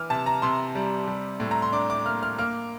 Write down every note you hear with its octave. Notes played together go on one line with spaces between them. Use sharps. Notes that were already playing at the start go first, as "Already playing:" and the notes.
Already playing: E3 D6 F6
C3 A5
A#5
C3 C6
G3
G3
A2
A#5
C6
D4 D6
D6
A#3 F6
F6
A#3 F6